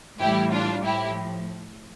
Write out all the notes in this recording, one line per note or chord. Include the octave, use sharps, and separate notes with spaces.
A2 E3 G3 E4 G4
D4 F4
A2 F3 E4 G4